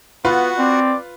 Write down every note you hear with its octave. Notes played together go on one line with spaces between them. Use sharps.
B3 F4 F#4 B4 F#5
C4 D5